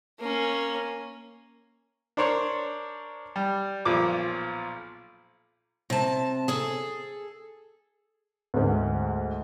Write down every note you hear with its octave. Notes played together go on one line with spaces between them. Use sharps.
A#3 C#4
D4 A#4 C5 C#5 C#6
G3
B1 A#2 F3 D6
C3 A5
G#4 A4
D2 G#2